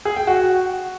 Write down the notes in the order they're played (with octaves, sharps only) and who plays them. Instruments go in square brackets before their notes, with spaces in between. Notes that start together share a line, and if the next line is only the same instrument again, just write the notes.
[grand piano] G#4
G5
F#4